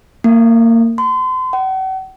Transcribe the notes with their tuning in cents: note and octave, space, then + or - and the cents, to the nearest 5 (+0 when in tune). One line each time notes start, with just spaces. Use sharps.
A#3 -25
C6 -35
F#5 +40